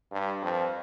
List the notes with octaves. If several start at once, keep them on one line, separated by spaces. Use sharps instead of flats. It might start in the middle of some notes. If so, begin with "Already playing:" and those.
G2
F2